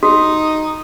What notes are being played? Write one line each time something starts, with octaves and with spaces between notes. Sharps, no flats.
D#4 F#4 D#6